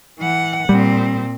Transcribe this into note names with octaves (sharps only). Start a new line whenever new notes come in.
E3 F#5
A#2 G3 C4